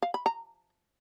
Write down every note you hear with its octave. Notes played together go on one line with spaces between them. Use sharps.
F5
B5
A#5